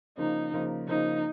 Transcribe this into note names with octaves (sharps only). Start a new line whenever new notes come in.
C#3 F3 A#3 D#4
C#3 F3 A#3
C#3 F3 A#3 D#4